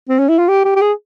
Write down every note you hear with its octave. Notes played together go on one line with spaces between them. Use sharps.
C4
C#4
E4
F4
G4
G4
G4
G#4